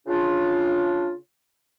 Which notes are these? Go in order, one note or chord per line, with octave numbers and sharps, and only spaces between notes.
C#3 D4 F4